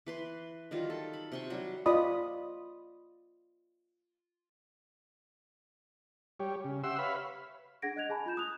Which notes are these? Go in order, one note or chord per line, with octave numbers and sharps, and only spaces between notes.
E3 B4 C6
D#3 F#3 G3 F4
A4
B5
C3 C6 C#6
F#3 G3
F4 D5 D#5 B5 D#6
G3 G4 C#5
C#3
G4 E5 F#5 C6 E6
B4 C#5 E5 F5 B5
D4 G#4 F#5 G#6 A#6 D7
D#5 F#6 G#6 F7
G#4 G#5 A5 B5
F4 B5 G6 E7
D#6 F#6 F7